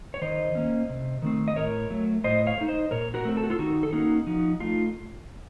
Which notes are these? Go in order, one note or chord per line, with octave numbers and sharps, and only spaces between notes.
C#5
D#3 C5 D#5
A#3 C#4
C3
D#3 A3 C4
D#5
A2 A#4 C#5
F#3 A3
A2 C5 D#5
C#5 F5
A3 D#4
C5 D#5
A#2 A#4 C#5
F#4 A#4
A3 C4
A4
F#4
F4 A4
D#3 D#4 F#4
A4
A#3 C#4 D#4 F#4
F3 D#4 F#4
A3 D#4 F4